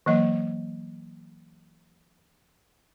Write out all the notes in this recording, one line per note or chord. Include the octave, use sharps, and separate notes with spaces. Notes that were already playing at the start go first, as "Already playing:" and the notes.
E3 F#3 A#3 D#5